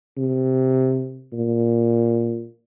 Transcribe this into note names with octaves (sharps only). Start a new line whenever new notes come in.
C3
A#2